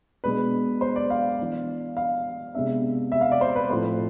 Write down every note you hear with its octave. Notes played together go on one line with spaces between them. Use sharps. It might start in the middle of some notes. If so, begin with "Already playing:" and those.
B2 G#3 D4 B4
C5
D5
F5
E3 B3 D4
F5
C3 G#3 B3 D4 E5
E5
F5
D5
C5
B4
A2 F3 A3 C4 C5